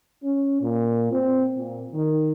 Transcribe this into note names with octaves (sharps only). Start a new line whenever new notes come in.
C#4
A#2
C4
A#2
D#3